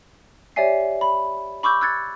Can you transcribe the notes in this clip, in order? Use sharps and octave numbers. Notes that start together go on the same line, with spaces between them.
G4 C#5 D5 E5 G#5 C7
B5
B5 C#6 D6 E6 G6
E6 F#6 G#6 A6 C#7